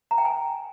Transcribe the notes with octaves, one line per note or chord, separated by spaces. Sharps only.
A#5
G5
G#5